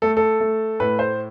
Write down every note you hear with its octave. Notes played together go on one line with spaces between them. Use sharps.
A3 A4
A4
A3
A2 B4
C5